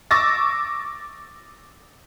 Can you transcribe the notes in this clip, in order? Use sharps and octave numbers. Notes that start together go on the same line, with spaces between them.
C#6 D6 E6 A6 A#6